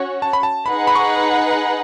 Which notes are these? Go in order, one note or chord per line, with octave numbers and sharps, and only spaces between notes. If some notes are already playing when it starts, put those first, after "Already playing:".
Already playing: C#4 F#4 C#5
A5
B5
A5
D#4 G#4 B4 F#5 B5
B5
C#6